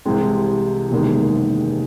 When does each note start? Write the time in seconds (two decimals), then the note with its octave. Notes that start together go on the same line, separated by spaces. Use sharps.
0.05 C2 C3 E3 G#3 C4
0.91 F#1 E2 C3 D#3 G#3